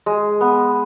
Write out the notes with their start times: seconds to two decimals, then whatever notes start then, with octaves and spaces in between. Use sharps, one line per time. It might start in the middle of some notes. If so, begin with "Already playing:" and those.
0.06 G#3
0.41 B3